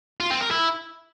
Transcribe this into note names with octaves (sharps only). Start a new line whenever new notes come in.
F4
C4
A#4
E4